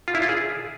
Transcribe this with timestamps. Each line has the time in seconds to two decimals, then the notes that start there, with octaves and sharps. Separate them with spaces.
0.08 F4
0.15 E4
0.22 F4
0.29 G#4